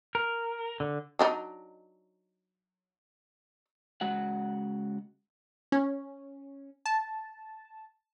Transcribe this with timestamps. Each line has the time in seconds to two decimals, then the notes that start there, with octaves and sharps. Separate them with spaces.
0.15 A#4
0.80 D3
1.19 F#3 D4 D#4
4.01 C#3 G#3 F#4 F#5
5.72 C#4
6.86 A5